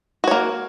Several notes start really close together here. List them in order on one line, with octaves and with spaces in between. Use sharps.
F#4 C#5 A#3